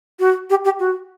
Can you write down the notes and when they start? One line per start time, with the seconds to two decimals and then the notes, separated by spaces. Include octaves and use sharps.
0.19 F#4
0.50 G4
0.65 G4
0.79 F#4